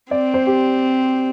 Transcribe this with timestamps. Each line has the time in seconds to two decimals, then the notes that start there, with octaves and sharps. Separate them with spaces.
0.11 C4 D5
0.34 C5
0.46 G4